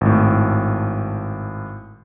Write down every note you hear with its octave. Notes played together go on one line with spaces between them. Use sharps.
G#1 A2